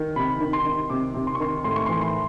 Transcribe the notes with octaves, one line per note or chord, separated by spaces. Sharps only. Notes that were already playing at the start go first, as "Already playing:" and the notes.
Already playing: D#3
C3 B5
D#3
C6
D#3
C3 D6
C3
C6
C#6
D#3 C6
A2 C6
C#6
E3 C6
C6